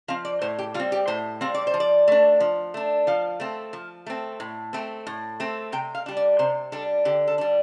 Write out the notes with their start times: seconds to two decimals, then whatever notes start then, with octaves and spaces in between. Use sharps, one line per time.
0.08 F3 C4 F5
0.25 D5
0.42 A2 C5
0.59 G4
0.74 G3 F4
0.80 C4
0.92 G4
1.08 A2 C5
1.41 G3 C4 F5
1.54 D5
1.67 C5
1.74 F3
1.80 D5
2.08 A3 D4
2.40 F3
2.74 A3 D4
3.07 F3 F5
3.40 A3 C4
3.73 F3
4.07 A3 C4
4.40 A2
4.73 A3 C4
5.07 A2
5.40 A3 C4
5.72 C3 G5
5.95 F5
6.06 G3 D4
6.17 D5
6.39 C3 C5
6.72 G3 D4 A4
7.05 D3 G4
7.28 A4
7.38 G3 D4